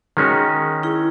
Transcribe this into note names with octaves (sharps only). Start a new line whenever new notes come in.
D#3 G#3 C#4 F#4
E4 G#4